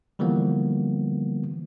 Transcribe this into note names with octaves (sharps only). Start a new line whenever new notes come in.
D3 E3 F3 G3 A#3 B3